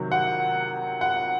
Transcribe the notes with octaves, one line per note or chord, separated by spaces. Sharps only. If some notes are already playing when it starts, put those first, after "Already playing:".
Already playing: C3 D#3 F#3
F#5
F#5